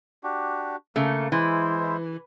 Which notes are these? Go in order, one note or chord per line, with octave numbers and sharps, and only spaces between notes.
D4 F#4 G4
C#3 A3 A#3
E3 G#3 E4 C5